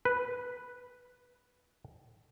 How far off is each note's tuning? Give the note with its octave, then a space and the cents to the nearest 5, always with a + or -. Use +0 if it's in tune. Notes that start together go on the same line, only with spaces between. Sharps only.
B4 +0